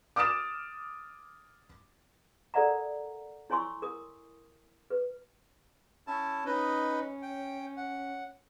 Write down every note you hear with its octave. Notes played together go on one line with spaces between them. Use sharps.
D6 D#6 F6 A6 E7
A4 A#4 D5 E5 F#5 A#5
E4 C#5 G#5 C6 C#6 E6
A#4 D#6
B4
C#4 E4 A5
C#4 D#4 B4 D#5
G5
F#5